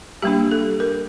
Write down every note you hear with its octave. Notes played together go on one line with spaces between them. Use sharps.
G3 A#3 D4 G4
A4
A#4